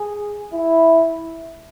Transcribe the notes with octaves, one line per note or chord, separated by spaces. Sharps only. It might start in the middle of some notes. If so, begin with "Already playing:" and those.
Already playing: G#4
E4